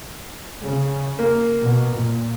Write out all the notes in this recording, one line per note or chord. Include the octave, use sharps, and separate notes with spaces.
C#3
A#3
B2
A#2